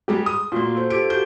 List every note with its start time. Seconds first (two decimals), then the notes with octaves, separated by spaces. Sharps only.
0.08 G3 G#3 G4
0.26 D#6
0.52 A#2 A#3 F#4 C6
0.75 A4 C5
0.90 F4 G4 A4 D7
1.10 F#4 G4 G6